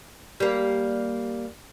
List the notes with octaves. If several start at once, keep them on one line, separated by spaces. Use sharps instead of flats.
G3 A#3